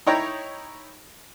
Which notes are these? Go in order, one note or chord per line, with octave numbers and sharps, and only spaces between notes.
D#4 E4 C#5 G5 A#5